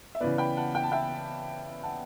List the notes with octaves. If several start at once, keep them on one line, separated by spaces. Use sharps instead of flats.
E5
C#3 E3 B3 B4 D5
G5 B5
F#5 A5
G5
A5
E5 G5
F#5 A5